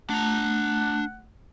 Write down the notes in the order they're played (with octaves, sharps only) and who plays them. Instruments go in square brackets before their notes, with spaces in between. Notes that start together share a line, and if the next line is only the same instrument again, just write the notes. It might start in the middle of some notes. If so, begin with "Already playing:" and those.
[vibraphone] A3 [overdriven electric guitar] D4 A#5 [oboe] F#5